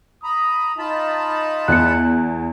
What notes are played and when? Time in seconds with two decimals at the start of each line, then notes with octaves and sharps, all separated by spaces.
0.24 A#5 B5 D#6
0.78 D#4 F4 A5 B5
1.68 E2 F#6 C#7